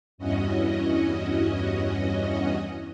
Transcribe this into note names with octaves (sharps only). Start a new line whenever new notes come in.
E2 G2 E3 C#4 F#4 D#5